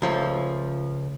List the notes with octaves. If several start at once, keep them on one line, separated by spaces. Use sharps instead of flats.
C#2 F3 A3